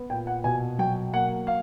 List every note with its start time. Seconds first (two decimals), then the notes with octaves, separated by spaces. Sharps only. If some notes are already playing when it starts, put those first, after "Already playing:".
Already playing: B3
0.10 A#2 G5
0.27 F#5
0.44 B2 G#5
0.79 F#3 G5
1.13 A#3 F#5
1.47 F5